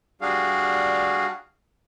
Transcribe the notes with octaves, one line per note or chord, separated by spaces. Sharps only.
G3 D4 F#4 G#4 F5